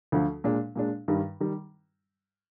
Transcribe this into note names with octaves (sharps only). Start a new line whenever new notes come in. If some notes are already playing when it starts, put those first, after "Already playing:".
D2 D3 F3
A#2 G#3 D4
A#2 G#3 D4
G2 D#3 G3
D#3 G3